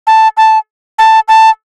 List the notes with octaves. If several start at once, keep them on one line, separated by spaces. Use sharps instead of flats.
A5
A5
A5
A5